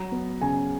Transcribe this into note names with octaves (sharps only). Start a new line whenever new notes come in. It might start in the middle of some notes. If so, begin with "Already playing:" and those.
Already playing: F#3 A#5
B3
C#3 G#5